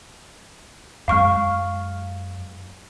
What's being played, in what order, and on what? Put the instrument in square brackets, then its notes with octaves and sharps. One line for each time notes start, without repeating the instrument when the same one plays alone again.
[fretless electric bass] F#2 G#3 [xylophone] F5 C#6 F6